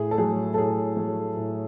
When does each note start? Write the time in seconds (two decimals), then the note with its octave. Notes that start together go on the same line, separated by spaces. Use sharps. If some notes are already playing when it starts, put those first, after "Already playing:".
Already playing: A2 G#4
0.11 A4
0.18 F#3 A3 G#4
0.54 A4
0.57 A2 G#4
0.97 F#3 A3
1.37 A2